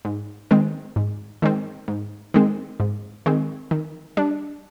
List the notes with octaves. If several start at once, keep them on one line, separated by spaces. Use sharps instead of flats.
G#2
D#3 G#3 C4
G#2
D#3 G#3 C4
G#2
D#3 G#3 C4
G#2
D#3 G#3 C4
D#3
G3 D4